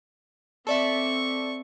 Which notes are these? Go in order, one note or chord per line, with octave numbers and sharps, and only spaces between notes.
C4 A4 D5 E5 C#6